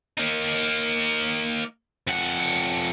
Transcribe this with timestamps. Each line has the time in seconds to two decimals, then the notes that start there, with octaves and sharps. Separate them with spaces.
0.18 A#3 D#4
2.07 F2 F#5